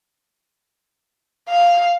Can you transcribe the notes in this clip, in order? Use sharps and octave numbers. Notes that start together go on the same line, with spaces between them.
F5